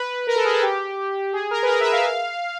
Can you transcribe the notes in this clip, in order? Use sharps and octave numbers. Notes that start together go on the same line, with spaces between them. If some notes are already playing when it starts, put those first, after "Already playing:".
Already playing: B4
A#4
A4
G#4
A4
G4
G#4
A#4
B4
A#4
E5
F5